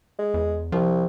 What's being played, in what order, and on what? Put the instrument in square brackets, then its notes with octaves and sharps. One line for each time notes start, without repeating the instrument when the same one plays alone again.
[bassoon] G#3
[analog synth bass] E2
[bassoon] C2 [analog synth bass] F3